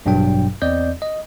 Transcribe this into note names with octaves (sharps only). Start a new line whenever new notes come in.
A1 G2 B2 F#3 D4 G5
E2 C4 D5 D#5 G6
D#5